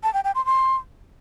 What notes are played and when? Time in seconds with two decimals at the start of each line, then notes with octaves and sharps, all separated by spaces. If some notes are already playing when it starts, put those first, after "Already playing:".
0.03 A5
0.14 G5
0.24 G5
0.35 C6
0.46 C6